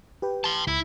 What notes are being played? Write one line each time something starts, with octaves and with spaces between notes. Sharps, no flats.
G4 B4 G5
A5 C6
C#2 E4 B5